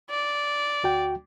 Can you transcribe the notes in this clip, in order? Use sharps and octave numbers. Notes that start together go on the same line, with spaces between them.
D5
D2 F#4 G5